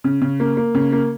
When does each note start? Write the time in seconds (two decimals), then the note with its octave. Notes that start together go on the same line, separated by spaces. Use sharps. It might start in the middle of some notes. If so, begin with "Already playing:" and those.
0.04 C#3
0.21 C#3
0.40 A#3
0.57 A#3
0.75 C#3
0.92 A#3